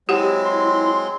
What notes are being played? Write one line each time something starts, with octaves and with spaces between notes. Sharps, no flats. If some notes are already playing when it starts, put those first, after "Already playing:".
F#3 G#3 C4 E4 G4 F#5
C6